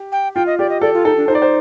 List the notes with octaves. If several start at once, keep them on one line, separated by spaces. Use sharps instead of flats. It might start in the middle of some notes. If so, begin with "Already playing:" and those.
Already playing: G4
G5
F4 G5
D#5
G4 D5
D#5
A4 D5
F4
D#4 A4
D4
D#4 C5
D5
C5